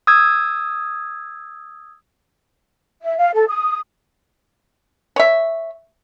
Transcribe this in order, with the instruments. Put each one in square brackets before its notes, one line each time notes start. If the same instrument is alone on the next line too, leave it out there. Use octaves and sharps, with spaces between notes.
[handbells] D#6 E6 G#6
[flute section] E5
F5
A4
D#6
[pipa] C#5 E5